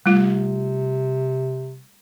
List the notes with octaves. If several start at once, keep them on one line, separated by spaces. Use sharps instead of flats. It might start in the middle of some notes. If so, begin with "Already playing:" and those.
C3 G3 A3 F4